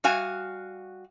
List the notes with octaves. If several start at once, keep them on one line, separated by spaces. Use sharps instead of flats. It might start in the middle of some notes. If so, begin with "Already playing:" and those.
G3 F#4 F5 G#5